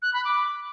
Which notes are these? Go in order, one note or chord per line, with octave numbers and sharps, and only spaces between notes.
F#6
B5
D6